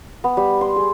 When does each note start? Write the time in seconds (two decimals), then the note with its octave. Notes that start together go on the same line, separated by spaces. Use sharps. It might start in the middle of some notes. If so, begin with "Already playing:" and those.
0.24 B3
0.37 G3
0.61 C6
0.76 G#4